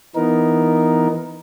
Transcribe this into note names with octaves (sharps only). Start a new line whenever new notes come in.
E3 B3 D#4 A#4